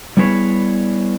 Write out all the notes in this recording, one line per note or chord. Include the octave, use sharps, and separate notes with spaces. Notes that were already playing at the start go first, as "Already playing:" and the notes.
G3 B3 E4 G#4 B4 C#5